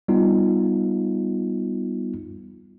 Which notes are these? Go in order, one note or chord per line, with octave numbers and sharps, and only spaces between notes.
G3 B3 D#4 F4